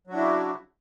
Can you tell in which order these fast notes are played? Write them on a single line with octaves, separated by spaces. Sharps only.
F#3 F#4 D4 E4 C#3